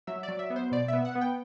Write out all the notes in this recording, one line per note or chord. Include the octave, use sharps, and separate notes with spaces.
F#3 E5
D5
F#3
E5
B3
C5
B2 D5
B3 E5
F#5
B3
G5